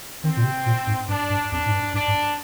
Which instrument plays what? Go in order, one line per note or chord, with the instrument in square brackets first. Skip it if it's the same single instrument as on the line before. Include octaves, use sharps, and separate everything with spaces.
[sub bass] D#3 [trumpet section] C4
[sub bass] A#2
C3
A#2
G#2
[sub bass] G2 [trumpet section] D4
[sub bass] G2
[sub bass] F2 [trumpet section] D4
[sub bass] G#2
G2
[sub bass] G2 [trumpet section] D4
[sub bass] G2